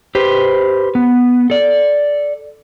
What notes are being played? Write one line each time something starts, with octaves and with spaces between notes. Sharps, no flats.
G4 B4 C5
B3
A4 D5